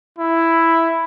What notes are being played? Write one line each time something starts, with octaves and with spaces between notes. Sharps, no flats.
E4